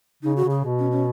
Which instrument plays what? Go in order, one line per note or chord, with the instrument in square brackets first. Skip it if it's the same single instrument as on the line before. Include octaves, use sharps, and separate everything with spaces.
[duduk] C#3 [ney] D#4
[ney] F#4
[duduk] C#3
[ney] G#4
[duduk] B2
[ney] C#4
C#4